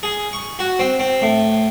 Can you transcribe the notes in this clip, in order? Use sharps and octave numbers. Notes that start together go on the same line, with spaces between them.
G#4
C#6
F#4
C4
C4
A2